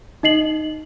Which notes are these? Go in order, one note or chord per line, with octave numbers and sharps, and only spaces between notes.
D#4 D#5 C7 F#7